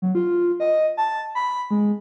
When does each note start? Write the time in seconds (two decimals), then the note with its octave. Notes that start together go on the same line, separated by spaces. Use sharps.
0.02 F#3
0.15 F4
0.60 D#5
0.97 A5
1.35 B5
1.71 G#3